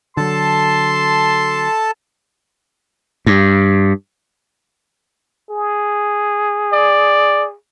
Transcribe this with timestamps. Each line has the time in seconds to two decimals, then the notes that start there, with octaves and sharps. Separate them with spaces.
0.17 D3 F#3 A4 A5 C6
3.26 G2
5.50 G#4
6.73 D5